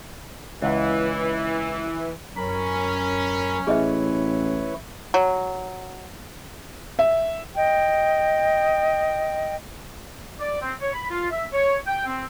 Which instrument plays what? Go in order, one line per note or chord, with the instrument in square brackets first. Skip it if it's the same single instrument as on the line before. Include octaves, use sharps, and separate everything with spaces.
[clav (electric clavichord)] C#2 F#5 [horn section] E3
[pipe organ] F#2 A#4 B5 [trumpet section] C#4
[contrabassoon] A1 [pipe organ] E4 B4 C#5 [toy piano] G#4 D#5 E5
[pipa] F#3
[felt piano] E5
[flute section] D#5 G5
[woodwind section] D5
C4
C#5
B5
F4
E5
C#5
G5
C4